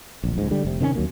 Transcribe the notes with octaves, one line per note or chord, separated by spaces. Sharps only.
D1 A#1
C#2 G#2
D3 G3
F1 C3
C3 D#3 G3 C#4
D#2 F#3 A#3